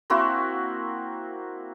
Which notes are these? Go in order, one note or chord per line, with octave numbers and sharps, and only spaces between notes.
A#3 C4 E4 F#4